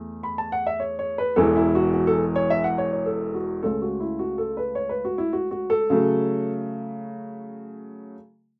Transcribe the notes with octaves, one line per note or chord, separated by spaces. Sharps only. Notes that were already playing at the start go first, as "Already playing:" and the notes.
Already playing: E2 A3
B5
A5
F#5
E5
C#5
C#5
B4
E1 E2 E3 A4
E4
F#4
F#4
A4
C#5
E5
F#5
C#5
C#5
A4
F#4
C#2 C#3 A3 A4
F#4
E4
F#4
A4
B4
C#5
B4
F#4
E4
F#4
F#4
A4
C#3 F#3 A3